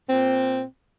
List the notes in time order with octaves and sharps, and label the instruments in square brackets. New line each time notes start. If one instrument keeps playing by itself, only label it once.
[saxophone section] A#2 C4